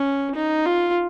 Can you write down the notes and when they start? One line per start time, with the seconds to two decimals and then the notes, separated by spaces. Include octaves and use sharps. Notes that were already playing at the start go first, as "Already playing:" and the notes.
Already playing: C#4
0.35 D#4
0.66 F4